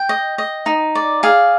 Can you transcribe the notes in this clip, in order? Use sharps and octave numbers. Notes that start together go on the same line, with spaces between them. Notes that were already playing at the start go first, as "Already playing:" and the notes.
Already playing: G5
D#5
D#5
D#4
D5
G#4 F5